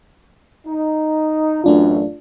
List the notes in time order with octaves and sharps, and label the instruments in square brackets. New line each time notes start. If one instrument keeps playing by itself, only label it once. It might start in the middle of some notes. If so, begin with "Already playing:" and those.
[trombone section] D#4
[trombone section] A1 F#2 [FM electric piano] A3 D4 F4